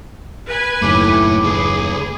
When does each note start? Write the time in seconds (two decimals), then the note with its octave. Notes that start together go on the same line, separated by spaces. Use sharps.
0.47 B4 G#5
0.82 F#1 D#2 A2 A3 E4 D6
1.42 C#2 G#4 B4